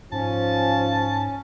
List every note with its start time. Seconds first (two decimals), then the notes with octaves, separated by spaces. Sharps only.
0.12 G#2 F3 C#4 A5